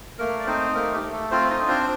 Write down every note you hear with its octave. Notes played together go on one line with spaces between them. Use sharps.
A3 A#3 A#4
D5
C4 D#4 C5
A3 A#3 A#4
G4
A3
A4
C4 F4 C5
D#4 D#5
D4
C4 C5